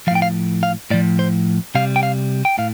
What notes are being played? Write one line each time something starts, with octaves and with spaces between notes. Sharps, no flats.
A2 F3 F5 G5
F5
F5
A2 F3 D5
C5
C3 G3 F5
G5
F5
G5
A2 F5